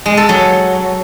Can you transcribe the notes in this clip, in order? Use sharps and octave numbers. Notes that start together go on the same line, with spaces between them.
G#3
A4
F#3